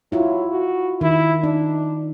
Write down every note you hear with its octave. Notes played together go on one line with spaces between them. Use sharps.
F#3 E4 F4
F#4
D#3 E4
D4 D#4